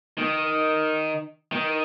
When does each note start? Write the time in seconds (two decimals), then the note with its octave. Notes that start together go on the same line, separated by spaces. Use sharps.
0.19 D#3
1.52 D#3